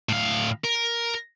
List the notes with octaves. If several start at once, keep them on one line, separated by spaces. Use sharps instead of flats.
A2 F5
A#4